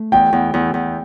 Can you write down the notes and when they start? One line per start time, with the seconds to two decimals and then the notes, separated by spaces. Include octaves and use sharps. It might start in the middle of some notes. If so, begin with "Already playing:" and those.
Already playing: A3
0.12 E2 G5
0.33 E2
0.54 E2
0.74 E2